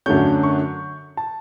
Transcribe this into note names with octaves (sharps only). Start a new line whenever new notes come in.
F#2 D3 A3 C#4 G6
C#6
A5